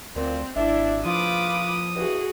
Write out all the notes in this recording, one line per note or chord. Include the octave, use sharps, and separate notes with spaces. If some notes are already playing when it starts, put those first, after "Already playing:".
D2 A#2 C4
G#1 D4 E4 D5 E5
F3 F4 B4 D6 D#6
G2 E3 F#4 G#4